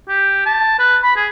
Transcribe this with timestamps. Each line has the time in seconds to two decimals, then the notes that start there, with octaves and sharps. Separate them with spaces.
0.08 G4
0.46 A5
0.79 B4
1.03 B5
1.16 G#4